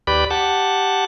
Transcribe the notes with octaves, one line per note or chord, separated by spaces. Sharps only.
D#2 G4 B4 D5 B5
G4 F#5 A5